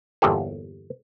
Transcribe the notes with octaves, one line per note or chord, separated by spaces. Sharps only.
G1 E2 A#2 G4 A4